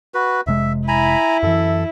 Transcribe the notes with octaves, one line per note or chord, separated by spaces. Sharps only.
F#4 B4
F1 C3 G#3 E5
E4 G#5 A#5 B5
F#2 E3 A4